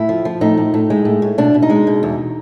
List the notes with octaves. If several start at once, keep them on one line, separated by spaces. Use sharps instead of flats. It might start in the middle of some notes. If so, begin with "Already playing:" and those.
Already playing: A2 E4
F3
F3
A2 D#4
A2
A2
G#3
A2
A2
B2 D4
B2
D#4
G#3
B2
E2